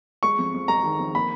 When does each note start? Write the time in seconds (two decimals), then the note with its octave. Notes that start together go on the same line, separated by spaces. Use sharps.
0.23 G#3 C#6
0.38 F2
0.54 F2
0.68 G#3 A#5
0.84 D#3
0.99 F2
1.15 A#3 B5